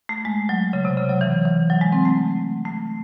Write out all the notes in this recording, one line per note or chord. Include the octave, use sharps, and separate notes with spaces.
A3
G#3
F#3
C#3
C3
C#3
F#3
E3
E3
F#3
G#3
C4
A3
A3